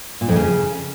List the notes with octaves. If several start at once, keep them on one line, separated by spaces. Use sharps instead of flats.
A#2
F2
C#3